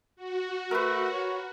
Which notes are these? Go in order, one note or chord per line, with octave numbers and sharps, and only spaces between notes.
F#4
A3 A#4 B4
C#5